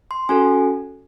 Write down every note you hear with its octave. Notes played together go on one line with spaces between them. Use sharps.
C6
C#4 F#4 A4 G#5